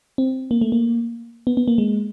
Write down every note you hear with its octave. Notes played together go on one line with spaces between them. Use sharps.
C4
A#3
A3
A#3
B3
B3
A#3
G#3